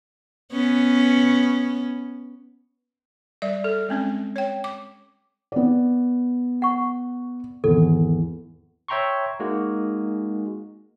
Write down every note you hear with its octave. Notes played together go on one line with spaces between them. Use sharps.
B3 C#4
G3 D5 E5
A4
G#3 C4 C#4
C#5 G5
D6
B3 D5
F#5 C#6
G#1 E2 A4
C#5 E5 G5 A#5 C6 C#6
G#3 A#3 D#4 F#4